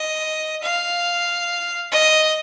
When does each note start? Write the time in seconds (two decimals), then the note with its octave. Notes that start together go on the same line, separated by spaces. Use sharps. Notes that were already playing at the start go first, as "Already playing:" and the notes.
Already playing: D#5
0.63 F5
1.92 D#5